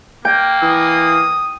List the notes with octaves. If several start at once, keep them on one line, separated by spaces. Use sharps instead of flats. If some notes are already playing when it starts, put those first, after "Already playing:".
A#3 G5
E3 D#6